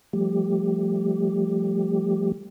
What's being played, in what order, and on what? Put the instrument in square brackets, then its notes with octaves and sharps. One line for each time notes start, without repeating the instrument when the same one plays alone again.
[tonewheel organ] F3 G3 A3 G4